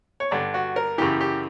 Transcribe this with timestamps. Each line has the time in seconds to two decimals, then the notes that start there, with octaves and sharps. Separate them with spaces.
0.20 C#5
0.31 G2 D3 D5
0.54 F#4
0.76 A#4
0.98 F#2 C#3 E3 G4
1.21 G4